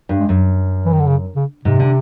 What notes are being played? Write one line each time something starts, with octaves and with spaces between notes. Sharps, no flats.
G2
G#3
F#2
E3
D#3
D3
C#3
C#3
G#2 C3
D3